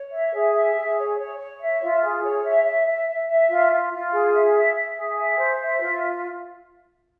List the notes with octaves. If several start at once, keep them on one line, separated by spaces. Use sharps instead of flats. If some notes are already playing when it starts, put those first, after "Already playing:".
Already playing: C#5
E5
G#4
E5
G#4
C#5
C#5
C#5
E5
F4
G#4
C#5
E5
E5
E5
E5
E5
F4
F4
F4
G#4
E5
E5
E5
G#4
E5
C5
E5
F4